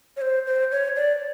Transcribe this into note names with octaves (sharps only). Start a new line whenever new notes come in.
C#5
C5
C5
C#5
D5